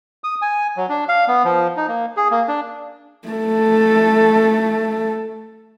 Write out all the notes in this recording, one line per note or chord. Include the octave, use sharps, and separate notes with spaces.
D#6
G#5
F#3
D4
F5
B3
F3
D#4
A#3
G#4
A#3
D4
A3 A4